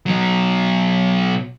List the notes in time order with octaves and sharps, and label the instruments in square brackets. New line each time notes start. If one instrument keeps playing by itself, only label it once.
[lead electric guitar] B2 F#3